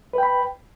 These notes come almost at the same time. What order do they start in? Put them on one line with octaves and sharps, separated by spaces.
B4 G5 B5